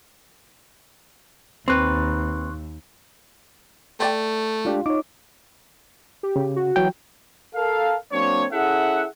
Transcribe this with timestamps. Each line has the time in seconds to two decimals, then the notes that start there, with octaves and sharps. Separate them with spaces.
1.68 D#2 C4 B4 C6 C#6 F#6
4.00 A3 C4 D5 G5
4.65 G#3 D4 F4 G4
4.86 D#4 C#5 D6
6.23 G4
6.36 C#3
6.56 F#4
6.76 E3 F#3 G5
7.56 A4 A#4 F5
8.12 F#3 A#3 C4 D4 C#5
8.52 C#4 E4 G#4 A4 E5 F#5